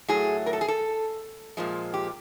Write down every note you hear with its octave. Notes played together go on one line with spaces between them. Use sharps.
A2 F#3 A3 G#4
A#4
A4
G#4
A4
A#2 F3 G#3
G4